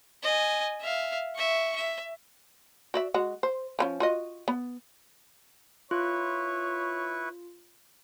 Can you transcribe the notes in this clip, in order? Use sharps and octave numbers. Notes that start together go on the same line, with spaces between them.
D#5 G#5
E5 F5
E5 C#6
E5
F#4 D5 E5
G#3 F#4
C5
F3 A#3 C#4
F4 F#4 D#5
B3
E4 F4 B4 C#5 C#6